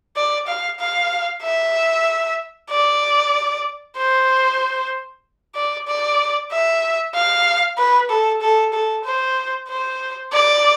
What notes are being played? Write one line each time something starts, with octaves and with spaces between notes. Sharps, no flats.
D5
F5
F5
E5
D5
C5
D5
D5
E5
F5
B4
A4
A4
A4
C5
C5
D5